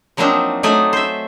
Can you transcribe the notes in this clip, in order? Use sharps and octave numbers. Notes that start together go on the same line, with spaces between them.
F3 F#3 A#3 C4 D4 D#4
F#3 A3 D#4 D5 G#5
C5 E5